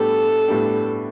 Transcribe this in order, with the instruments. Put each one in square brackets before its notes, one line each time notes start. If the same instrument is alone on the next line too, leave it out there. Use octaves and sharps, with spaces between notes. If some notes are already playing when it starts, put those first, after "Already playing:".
Already playing: [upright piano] A2 G3 B3 D4 G4 [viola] A4
[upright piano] A2 G3 B3 D4 G4